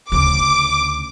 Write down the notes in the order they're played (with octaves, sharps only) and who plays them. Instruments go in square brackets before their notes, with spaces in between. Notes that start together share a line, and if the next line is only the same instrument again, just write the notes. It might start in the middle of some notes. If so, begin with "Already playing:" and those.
[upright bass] D2 C#3 [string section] D6